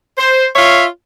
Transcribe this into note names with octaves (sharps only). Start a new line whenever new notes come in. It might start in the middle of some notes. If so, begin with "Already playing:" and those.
C5
F4 C#5 E5 F5